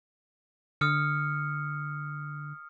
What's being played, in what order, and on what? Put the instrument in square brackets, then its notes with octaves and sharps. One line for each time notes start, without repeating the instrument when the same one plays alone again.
[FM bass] D3 [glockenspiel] D#6 F6 C#7